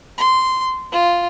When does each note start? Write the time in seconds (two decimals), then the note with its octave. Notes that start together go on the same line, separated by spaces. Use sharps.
0.18 C6
0.92 F4